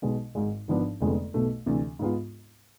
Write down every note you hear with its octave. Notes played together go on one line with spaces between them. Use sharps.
B1 B2 G#3 B3
G#1 G#2 G#3
G#1 G#2 F3 B3 D4
F1 F2 D3 G#3 B3
B1 B2 A3
D2 C3 E3
G#2 G#3 B3 F4